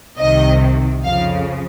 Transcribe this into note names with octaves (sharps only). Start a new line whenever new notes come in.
C2 C3 D#3 D#5
F2 C#3 F3 F5